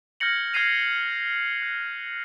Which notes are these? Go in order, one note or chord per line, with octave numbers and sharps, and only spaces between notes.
F6 G6 G#6 A#6 C#7 F#7
F6 G#6 A6 C7 D#7 F7
F#6